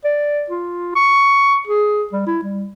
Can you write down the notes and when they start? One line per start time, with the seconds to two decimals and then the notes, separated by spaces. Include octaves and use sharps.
0.05 D5
0.50 F4
0.95 C#6
1.67 G#4
2.13 G3
2.27 E4
2.43 G3